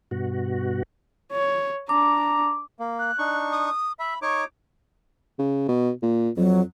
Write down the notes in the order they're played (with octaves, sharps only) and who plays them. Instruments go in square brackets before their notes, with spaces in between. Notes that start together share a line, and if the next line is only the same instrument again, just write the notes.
[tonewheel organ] G2 B2 F#4
[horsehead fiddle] C#5
[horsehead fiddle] D4 [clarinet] A#5 [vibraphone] D6
[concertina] A#3
[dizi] F#6
[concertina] D4 D#4 C#6
[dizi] D#6
[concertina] E5 [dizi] B5
[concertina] D#4 C#5 D6 [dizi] C#6
[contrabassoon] C#3
B2
A#2
[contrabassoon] F2 [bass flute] F#3